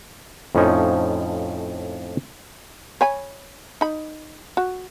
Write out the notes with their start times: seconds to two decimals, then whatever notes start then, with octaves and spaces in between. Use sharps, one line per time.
0.55 F2 A2 F3 C#4 D#4
3.01 C#5 G#5 B5
3.81 D#4 B5
4.57 F#4